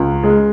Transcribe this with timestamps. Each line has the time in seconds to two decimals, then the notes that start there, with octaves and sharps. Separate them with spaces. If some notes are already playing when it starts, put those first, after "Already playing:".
Already playing: C#2
0.23 G#3